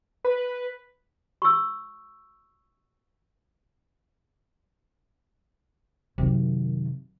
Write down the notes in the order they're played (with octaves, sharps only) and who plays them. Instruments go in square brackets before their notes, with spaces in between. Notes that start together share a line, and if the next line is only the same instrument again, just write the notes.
[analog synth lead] B4
[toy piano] C#6 E6
[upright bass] F#2 D#3 [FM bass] C3